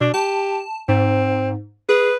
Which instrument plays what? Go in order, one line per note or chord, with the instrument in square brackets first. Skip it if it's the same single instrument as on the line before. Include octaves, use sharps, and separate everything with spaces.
[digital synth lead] B2 [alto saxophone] D4
[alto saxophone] G4 [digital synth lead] A5
[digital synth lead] G#2 [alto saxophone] C4
[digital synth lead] G#4 [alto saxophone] B4